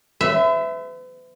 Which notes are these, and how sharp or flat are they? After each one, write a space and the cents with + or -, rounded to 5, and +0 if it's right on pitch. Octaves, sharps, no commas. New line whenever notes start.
B4 +45 E5 +0